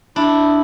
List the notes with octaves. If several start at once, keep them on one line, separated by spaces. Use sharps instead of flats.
D4 E4